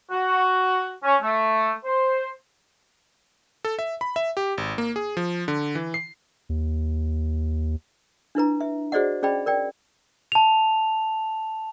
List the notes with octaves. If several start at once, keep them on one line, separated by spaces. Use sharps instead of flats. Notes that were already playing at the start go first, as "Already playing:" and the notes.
F#4
C#4
A3
C5
A4
E5
B5
E5
G4
G#1
A#3
G#4
F3
D3
E3
C7
D#2
D4 E4 B4 A#5
E5
F#4 G#4 C5 D5 D#5 F#5
C#4 G#4 D5 D#5 G5 B5
A#4 D5 G5
A5 F7